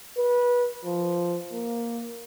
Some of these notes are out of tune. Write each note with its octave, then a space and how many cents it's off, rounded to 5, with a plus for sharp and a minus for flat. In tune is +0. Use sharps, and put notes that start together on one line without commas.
B4 -20
F3 -5
A#3 +5